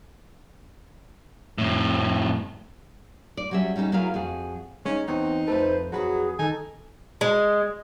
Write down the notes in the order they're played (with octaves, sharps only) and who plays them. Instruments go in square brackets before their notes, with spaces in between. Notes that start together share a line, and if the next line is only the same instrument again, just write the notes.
[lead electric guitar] F2 A2
[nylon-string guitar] D5
F#3 G3 C#4 G#4 E5
G3 C#4 D#4 F#4 A4
F#3 E4 F4 G#4 A#4 F5
F2 F#4 G#4
[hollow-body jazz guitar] G#3 D#4 [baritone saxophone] C#4
[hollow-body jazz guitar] E2 B3 C#5 [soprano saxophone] C4 [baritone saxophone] D#4
[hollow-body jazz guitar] F2 A3 A4 [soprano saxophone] B4 [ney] C5
[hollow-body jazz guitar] F2 B4 B5 [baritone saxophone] F#3 [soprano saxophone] F#4 [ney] G#4
[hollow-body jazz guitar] D#3 [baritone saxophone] D#4 [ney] A4 [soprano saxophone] G#5
[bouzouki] G#3